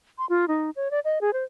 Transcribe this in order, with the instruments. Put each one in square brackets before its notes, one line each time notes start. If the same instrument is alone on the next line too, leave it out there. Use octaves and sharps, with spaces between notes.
[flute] C6
F4
D#4
C#5
D5
D#5
G#4
C5